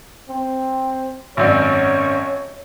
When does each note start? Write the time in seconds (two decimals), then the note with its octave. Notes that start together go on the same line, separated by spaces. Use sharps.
0.29 C4
1.37 G#1 F#2 C#5 D5